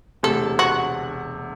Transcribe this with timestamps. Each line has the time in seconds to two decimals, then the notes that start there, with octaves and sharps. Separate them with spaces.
0.23 E1 D2 C3 A4
0.59 F#4